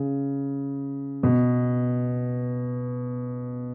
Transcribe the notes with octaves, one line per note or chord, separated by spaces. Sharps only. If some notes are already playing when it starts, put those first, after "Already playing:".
Already playing: C#3
B2